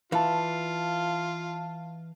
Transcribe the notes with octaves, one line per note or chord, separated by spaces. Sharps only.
E3 F4 F5 A5